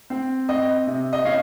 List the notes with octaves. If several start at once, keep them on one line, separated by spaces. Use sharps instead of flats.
C4
C4 D#5
C3
D#5
C#4 F5